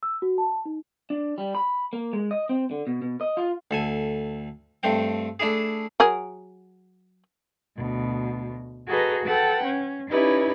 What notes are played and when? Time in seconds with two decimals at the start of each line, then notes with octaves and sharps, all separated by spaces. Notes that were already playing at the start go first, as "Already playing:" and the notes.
0.03 E6
0.22 F#4
0.38 A5
0.65 D#4
1.10 D4
1.38 G3
1.55 B5
1.93 A#3
2.13 G#3
2.31 D#5
2.49 C4
2.71 D3
2.87 B2
3.02 B2
3.21 D#5
3.37 F4
3.71 D2 A4 G#5
4.83 G2 A3 C4 G5
5.40 A3 D4 E4 G#4
6.00 F#3 G#4 A#4
7.77 D2 B2
8.88 F#4 G#4 A4 B4 D#5 A#5
9.25 A4 B4 F#5 G5
9.64 C#4
10.10 C#4 D#4 E4 G4 B4 D5